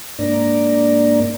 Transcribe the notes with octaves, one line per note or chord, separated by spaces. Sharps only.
G#2 A#3 D4 D5 A#5